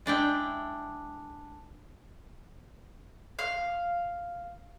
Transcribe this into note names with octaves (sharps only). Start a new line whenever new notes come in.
G#3 D4 E4 G5
F5